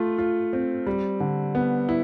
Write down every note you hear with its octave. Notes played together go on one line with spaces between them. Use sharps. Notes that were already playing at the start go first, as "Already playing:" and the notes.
Already playing: A3 F4
F4
C4
G3
D3
B3
E4